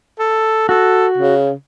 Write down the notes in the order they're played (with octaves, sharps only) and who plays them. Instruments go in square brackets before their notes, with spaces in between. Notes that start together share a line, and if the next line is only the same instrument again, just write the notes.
[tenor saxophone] A4
[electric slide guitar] F#4 [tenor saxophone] A4
[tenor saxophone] C#3